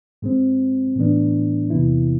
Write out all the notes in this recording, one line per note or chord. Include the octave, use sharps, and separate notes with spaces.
G#2 G#3 C4
A2 E3 B3 D4
E2 C3 E3 B3 E4